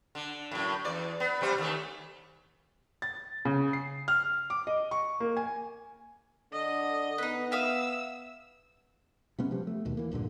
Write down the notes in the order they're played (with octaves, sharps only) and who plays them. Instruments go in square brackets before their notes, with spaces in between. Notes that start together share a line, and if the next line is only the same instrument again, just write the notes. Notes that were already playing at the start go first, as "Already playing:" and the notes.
[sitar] D3
F#2 A2
E2 D5
B3
C3 G3 C5
D#2 A3
[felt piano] A6
C#3
C7
F6
D6
D#5
C#6
A#3
G#5
[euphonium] D3 [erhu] D#5
[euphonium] B3 [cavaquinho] D#4 B4
[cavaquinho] E5 F5 D#6 [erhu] E6
[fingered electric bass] C3 G#3 B3 C#4
F3 G3
A3
D#2 B2
E3 A#3
A#1 G2 A#2 D3